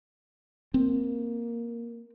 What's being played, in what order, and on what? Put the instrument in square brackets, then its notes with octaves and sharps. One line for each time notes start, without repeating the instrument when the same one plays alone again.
[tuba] A#3 [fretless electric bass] C4